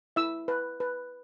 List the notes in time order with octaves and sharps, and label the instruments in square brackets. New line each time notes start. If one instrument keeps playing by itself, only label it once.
[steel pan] E4 E5 E6
B4
B4